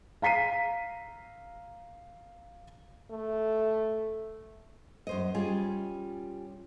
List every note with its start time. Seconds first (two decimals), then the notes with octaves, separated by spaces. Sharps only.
0.22 F5 A#5 B6 C7 D#7
3.11 A3
5.07 F#2 C5 D#5
5.35 G3 C#4 F4 G#4